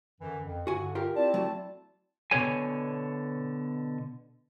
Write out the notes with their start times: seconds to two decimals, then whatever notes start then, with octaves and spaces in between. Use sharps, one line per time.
0.21 F#2 D3 E3
0.45 F2
0.67 G2 D3 F#4 G#5
0.95 F4 G4 A#4
1.16 C4 E4 D5 A5
1.34 F#3 A3
2.31 B2 D3 C#5 G#5